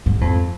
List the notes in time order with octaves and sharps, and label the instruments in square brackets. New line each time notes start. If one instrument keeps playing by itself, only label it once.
[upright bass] G#2
F2